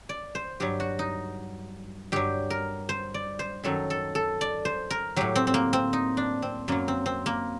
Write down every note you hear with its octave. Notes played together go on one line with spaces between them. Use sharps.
D5
C5
G2 F#3 G4
F#4
D#4
G2 F#3 G4
A#4
C5
D5
C5
F#2 D#3 F#3 A4
A4
A4
D5
C5
A#4
A2 F#3 G4
C4
C4
A#3
C4
D#4
D4
C4
F#2 F#3 A#3
C4
C4
A#3